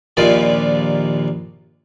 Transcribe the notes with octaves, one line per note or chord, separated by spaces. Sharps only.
A#1 D#2 A#2 D5